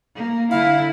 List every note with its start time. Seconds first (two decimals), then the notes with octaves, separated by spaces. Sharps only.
0.16 A#3
0.52 D3 E4 F5